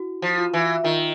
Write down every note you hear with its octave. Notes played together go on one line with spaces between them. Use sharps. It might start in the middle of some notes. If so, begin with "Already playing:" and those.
Already playing: E4 F#4
F3
F4
E3
D#3 F4